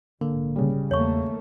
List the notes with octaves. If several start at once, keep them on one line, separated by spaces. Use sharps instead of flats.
A#1 G#2 D3 A#3
C#3 G3
E2 D#3 A3 A#3 C#5 C#6